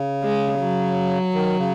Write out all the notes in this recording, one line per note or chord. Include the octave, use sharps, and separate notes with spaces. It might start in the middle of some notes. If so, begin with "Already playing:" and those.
Already playing: C#3
G#3
F#3
D#3
C#3